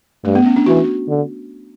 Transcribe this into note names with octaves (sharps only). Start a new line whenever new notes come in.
G2 A3
B3
C#4
D4
E3 F#4
D3